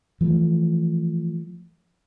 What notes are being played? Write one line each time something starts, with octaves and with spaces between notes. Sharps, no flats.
E3 F3 A3